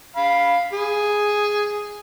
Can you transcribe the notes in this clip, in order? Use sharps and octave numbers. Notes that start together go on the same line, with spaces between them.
F5 B5
G#4